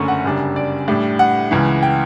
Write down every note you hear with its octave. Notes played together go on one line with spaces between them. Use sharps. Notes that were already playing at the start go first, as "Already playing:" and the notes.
Already playing: F#1 F#2 D3 A3 C#4 C#6
F#5
G1 F#2 C#3 G3 D4
D5
A2 G3 D4
F#5
C#2 C#3 E3
G5